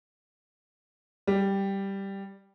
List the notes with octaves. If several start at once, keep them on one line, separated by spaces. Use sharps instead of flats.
G3